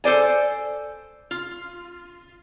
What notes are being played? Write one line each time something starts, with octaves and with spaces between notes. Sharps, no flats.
A4 C5 D5 G#5
F4